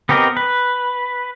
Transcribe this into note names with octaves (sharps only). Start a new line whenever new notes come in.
B3 C4 G4 A#4 D#5
B4